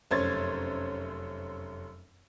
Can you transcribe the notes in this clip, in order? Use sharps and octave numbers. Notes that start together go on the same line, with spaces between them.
F1 F#2 C5 C#5 G#6 A6